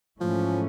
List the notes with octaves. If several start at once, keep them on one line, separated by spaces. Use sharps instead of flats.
G#2 E3 F3 A3 C#4